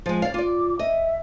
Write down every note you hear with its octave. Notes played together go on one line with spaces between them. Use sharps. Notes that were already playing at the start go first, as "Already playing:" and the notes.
F3 G#3
C#5 D5 F5
F4 D5 D6
D#5 E5